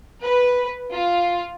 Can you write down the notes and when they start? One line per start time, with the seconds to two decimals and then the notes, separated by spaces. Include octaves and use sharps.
0.23 B4
0.92 F4